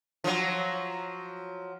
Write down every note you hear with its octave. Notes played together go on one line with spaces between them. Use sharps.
F3 F#3